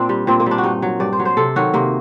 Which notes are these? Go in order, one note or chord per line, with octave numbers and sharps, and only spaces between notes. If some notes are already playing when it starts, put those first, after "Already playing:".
Already playing: A#2 C4 D4
G3
A#2 C4
A#3
G3 D4
F#4
G2 D#4
F#3
G2 D5
C5
F#3
C5
C3 A4
D#3 F#3 F#4
C3 A#3